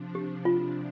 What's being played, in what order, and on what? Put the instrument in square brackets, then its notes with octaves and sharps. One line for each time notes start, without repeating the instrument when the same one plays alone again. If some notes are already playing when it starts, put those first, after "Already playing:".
Already playing: [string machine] C3 F3 D4
[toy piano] G4
F4